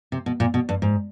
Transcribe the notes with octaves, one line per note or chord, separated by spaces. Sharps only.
C3
B2
A#2
B2
G2
G#2